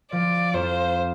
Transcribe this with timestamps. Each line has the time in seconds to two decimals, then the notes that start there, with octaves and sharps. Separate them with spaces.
0.12 F3 D5
0.54 F2 C5